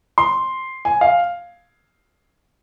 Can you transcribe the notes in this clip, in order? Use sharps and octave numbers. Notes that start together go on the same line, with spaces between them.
C6
G#5
F5